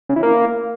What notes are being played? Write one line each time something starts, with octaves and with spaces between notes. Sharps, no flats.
C#3
E3
A#3